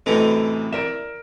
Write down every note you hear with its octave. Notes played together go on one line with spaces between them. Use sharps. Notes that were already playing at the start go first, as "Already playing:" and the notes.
F#2 A2 C3 E3 A4 B4 D#5
A#4 D5 E5 D7 E7